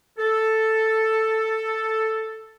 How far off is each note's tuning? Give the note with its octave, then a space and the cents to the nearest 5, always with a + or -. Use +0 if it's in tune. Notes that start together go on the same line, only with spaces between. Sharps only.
A4 +5